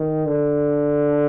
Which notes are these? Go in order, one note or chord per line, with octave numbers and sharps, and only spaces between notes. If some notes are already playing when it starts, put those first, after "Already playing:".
Already playing: D#3
D3